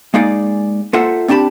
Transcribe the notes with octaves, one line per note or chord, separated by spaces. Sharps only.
G#3 A#3 D#4 G#4 D5
A#3 F4 A4 C5 E5 F#5
C4 D4 G4 A5 B5